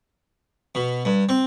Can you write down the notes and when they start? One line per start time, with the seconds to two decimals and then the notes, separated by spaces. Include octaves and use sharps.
0.75 B2
1.05 G2
1.29 C4